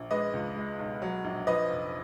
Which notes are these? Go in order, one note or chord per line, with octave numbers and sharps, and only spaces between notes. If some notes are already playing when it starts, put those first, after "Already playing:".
Already playing: A#1
G#3 B4 D#5
C#2
G#3
B1
F#3
A#1
F3 B4 D#5
F1